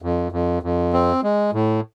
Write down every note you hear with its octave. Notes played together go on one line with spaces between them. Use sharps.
F2
F2
F2
C4
G#3
A2